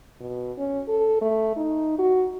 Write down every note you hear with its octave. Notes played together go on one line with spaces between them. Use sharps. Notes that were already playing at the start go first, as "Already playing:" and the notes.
B2
C#4
A4
A3
D#4
F#4